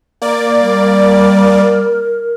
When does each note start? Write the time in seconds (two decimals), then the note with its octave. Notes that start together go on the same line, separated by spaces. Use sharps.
0.22 A#3 D5
0.61 G3 A#4